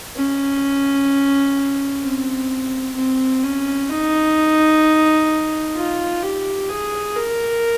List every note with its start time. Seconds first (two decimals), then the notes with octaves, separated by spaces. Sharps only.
0.16 C#4
2.03 C4
2.96 C4
3.43 C#4
3.89 D#4
5.76 F4
6.23 G4
6.69 G#4
7.16 A#4